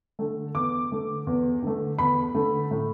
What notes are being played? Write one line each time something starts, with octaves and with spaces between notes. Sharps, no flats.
D3 A3
E2 D6
D3 A3
E2
D3 A3
E2 B5
D3 A3
A2